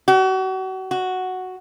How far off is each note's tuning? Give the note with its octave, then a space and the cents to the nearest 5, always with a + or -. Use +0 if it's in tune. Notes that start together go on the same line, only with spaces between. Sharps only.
F#4 +35
F#4 +0